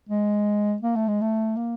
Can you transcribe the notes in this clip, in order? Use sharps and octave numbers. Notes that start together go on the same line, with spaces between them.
G#3
A#3
A3
G#3
A3
A#3